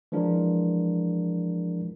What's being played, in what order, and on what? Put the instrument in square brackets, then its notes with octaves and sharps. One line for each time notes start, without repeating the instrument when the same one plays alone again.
[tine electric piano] E3 F3 G#3 D4 F4 A#4